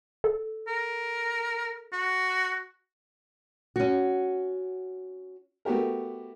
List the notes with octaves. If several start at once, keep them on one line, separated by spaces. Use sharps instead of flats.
A4
A#4
F#4
C#4 F#4
A3 B3 F#4 G4 A#4